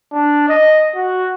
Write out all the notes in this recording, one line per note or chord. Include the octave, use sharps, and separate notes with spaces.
D4
D#5
F#4